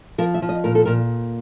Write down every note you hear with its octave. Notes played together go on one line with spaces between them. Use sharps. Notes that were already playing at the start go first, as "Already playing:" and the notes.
F3 A#4
E5
F3
D#5
A#2 A#4
A4
A#2 A#4